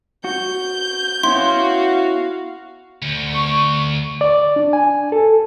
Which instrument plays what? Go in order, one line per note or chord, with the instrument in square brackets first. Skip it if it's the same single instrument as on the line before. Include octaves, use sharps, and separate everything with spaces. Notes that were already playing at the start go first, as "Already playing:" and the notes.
[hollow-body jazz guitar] F#4 [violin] G6
[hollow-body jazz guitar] B3 C#4 E4 [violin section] F#4 F5 [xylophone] C6
[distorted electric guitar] D2
[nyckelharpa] C#6
[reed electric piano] D5
D4
G#5
A4